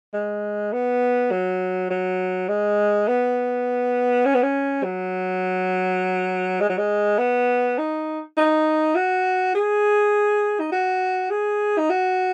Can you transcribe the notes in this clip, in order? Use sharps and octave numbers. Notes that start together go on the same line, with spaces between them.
G#3
B3
F#3
F#3
G#3
B3
C#4
B3
C#4
F#3
G#3
F#3
G#3
B3
D#4
D#4
F#4
G#4
D#4
F#4
G#4
D#4
F#4